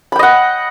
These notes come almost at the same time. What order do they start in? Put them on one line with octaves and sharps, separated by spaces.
B5 G5 D#5 F#5